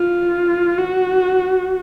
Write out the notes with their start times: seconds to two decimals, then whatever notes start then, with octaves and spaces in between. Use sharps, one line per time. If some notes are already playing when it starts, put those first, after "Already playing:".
Already playing: F4
0.78 F#4